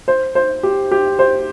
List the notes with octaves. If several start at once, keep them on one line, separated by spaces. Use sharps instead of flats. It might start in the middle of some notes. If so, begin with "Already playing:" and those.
C5
C5
G4
G4
C5